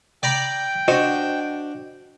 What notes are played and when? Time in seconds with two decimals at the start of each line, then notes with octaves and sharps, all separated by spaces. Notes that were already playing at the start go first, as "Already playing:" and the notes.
0.23 D5 G5 A#5 B5
0.88 D4 F#4 C5 D#5